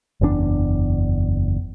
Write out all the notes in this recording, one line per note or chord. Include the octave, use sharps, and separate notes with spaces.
F#1 E2 C#3 D4